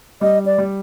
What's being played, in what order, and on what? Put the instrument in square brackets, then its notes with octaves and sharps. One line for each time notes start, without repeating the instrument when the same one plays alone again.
[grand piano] G3 [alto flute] D#5
[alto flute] D5
[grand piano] G3